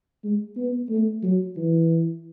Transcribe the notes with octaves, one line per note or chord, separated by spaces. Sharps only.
G#3
B3
A3
F#3
E3